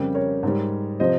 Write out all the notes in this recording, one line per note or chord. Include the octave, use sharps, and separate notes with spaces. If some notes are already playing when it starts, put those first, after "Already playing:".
Already playing: F2 C#3 G3 G4 A#4
A#4 C#5
G#2 G3
C3 F3 C5 D#5